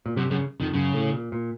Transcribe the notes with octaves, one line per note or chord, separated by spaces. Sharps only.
A#2
F#2 C3
F#2 C#3
F2 D#3
F#2 C#3
A2
A#2
A#2